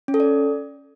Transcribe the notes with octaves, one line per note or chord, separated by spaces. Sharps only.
C#4
A4
D5